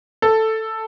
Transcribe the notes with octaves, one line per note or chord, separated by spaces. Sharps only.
A4